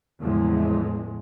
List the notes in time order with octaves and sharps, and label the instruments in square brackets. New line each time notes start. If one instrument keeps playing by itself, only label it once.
[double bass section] E2 A2 C#3 E3 F3 G#3